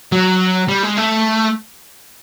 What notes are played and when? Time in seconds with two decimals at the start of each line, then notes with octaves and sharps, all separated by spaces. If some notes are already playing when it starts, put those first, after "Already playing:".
0.12 F#3
0.68 G3
0.83 G#3
0.97 A3